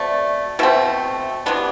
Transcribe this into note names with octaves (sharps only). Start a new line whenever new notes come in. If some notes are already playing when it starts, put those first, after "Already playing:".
Already playing: B2 A3 C4 D5
B2 A3 C4 E5
C3 E3 B3 D4